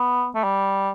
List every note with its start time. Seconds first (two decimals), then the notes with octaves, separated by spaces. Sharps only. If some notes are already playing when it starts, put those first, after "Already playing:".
Already playing: B3
0.35 A3
0.44 G3